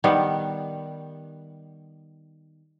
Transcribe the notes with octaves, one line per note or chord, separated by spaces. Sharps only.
D#3 G3 B3